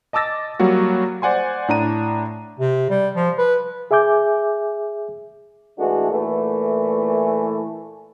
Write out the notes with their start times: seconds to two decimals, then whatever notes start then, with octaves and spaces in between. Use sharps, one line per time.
0.13 D#5 A5 D6 E6 A6 A#6
0.60 F#3 G3 A#3 F#4
1.22 C5 D5 F#5 G#5 C6
1.68 A2 D4 A#5 D#7
2.59 C3
2.90 G3
3.16 F3
3.38 B4
3.91 G#4 E5 G#5 D6 G6
5.79 A1 E3 G#3 A3 D4 F#4
6.12 A#2 E3 A3